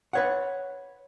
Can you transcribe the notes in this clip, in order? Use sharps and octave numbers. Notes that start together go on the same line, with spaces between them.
B4 C#5 F#5